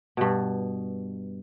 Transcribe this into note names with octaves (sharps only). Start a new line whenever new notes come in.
G2 B2